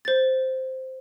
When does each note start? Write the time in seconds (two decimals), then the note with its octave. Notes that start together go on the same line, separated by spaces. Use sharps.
0.05 C5 A6